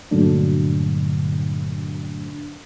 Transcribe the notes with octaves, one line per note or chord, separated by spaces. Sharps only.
G2 A#2 D3 F#3 A3 D4